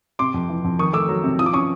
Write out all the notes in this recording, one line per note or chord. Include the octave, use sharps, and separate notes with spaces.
C3 C6 D6
F2
E3
F2
D#3 C#6 D#6
A3 D6 E6
F#3
C3
F3 D#6
D6
C#4 C#6 D#6